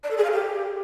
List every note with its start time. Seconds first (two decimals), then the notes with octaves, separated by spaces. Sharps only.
0.04 D5
0.10 A4
0.17 G#4
0.24 F5
0.31 G4